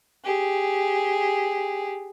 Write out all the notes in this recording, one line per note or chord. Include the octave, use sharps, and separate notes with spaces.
G4 G#4